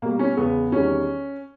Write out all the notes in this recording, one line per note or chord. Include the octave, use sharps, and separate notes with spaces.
B2 G3 A#3
C#4
E2 C#3 G#3 B3
E2 D#3 G3 C#4